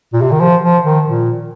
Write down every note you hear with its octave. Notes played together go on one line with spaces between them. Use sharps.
A#2
C3
D#3
F3
F3
D#3
A#2